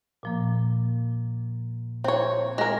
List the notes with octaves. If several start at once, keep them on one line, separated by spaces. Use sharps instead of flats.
A#2 F3 A#3
C4 C#5
G#3 A#4